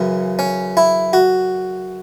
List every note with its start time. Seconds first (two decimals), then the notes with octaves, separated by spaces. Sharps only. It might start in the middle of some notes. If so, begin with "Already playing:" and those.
Already playing: F#2 C#3 E3
0.39 C#4
0.77 E4
1.13 F#4